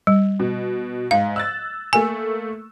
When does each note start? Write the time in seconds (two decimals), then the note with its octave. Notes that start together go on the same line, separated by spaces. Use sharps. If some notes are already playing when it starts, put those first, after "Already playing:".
0.07 G3
0.40 B2
1.11 G#2 F5
1.36 E6 F#6 A6
1.93 A3 A#3 G#5 E6